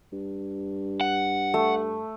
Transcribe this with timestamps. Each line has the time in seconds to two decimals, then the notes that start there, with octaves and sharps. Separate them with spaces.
0.12 G2
1.01 F#5
1.54 A3